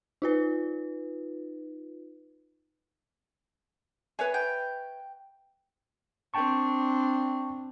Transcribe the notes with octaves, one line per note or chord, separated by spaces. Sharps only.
D#4 F4 B4
G#4 B4 C#5 E5
G5
C4 D4 G5 A5 C#6